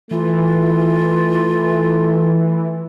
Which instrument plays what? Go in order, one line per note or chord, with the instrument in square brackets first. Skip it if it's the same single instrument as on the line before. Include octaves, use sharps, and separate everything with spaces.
[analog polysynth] E3 [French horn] A3 [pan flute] F4